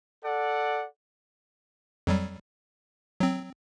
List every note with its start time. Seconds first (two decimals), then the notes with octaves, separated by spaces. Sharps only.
0.24 A4 D5 F#5
2.07 F2 F#3 G3
3.20 F#3 C4